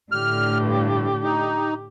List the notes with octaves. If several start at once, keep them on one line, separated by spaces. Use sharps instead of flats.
A2 D3 G4 F6
G2
D#4